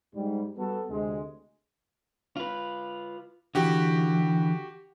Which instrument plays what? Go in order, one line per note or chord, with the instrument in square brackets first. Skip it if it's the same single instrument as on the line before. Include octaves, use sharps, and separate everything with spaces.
[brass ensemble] G#2 G3
G3 B3 F#4 A4
D2 C3 G#3
[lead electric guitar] F4 B4
[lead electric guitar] D3 E3 [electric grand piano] F#4 G4